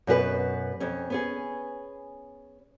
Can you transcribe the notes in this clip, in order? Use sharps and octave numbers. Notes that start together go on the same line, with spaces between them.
F#2 B2 G4 B4
F2 C#4
B3 C#4 G#4